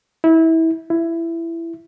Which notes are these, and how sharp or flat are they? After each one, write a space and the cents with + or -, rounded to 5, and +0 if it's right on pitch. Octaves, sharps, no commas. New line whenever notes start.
E4 -25
E4 +15